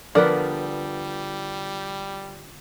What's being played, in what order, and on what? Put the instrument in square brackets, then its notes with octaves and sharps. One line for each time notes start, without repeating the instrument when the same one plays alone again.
[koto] D3 B3 [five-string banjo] F3 A#4 [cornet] G3 [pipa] D5